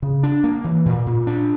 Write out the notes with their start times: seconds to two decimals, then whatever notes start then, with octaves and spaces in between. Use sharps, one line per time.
0.02 C#3
0.23 D4
0.44 A#3
0.64 E3
0.86 A#2
1.06 A#2
1.27 D4